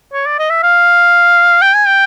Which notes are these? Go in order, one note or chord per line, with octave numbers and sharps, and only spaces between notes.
C#5
D5
D#5
E5
F5
G5
G#5
G5